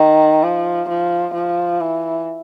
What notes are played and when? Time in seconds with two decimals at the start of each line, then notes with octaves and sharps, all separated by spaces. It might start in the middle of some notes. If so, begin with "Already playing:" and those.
Already playing: D#3
0.43 F3
0.89 F3
1.34 F3
1.80 E3